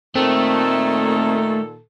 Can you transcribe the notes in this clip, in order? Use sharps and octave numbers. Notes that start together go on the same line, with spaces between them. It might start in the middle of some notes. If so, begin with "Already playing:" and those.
A#2 D#3 A3 C4 A4